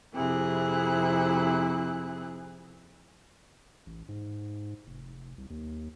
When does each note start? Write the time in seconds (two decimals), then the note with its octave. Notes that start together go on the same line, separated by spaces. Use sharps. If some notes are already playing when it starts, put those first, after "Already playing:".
0.14 F2 C3 E4 G#4 F#6
3.86 A1
4.08 G#2
4.87 F1
5.38 C2
5.50 D#2